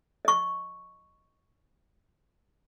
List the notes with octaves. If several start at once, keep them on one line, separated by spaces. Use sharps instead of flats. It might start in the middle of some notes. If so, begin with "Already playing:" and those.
D#5 C#6